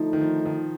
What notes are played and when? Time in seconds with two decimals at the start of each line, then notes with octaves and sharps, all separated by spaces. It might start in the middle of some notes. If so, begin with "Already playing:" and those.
Already playing: D3 F3 A3 D#4
0.13 D#3
0.21 F3
0.45 D#3